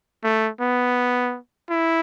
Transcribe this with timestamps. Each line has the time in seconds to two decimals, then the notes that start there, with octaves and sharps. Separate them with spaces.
0.24 A3
0.60 B3
1.70 E4